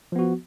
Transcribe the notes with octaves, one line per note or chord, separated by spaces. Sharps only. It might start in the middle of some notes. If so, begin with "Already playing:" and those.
F3 B3 F#4